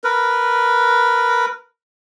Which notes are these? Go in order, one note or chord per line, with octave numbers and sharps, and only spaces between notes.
A#4 B4